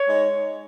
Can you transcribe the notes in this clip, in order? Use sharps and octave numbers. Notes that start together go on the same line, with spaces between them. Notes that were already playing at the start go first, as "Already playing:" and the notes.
Already playing: C#5
G#3 D#4